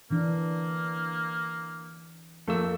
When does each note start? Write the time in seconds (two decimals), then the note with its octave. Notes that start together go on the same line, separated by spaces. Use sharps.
0.11 D3 E3 A#3 D4
2.48 F2 A3 A#3 E6